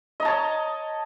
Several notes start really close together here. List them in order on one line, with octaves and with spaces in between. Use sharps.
D#5 A#5 A5 C#5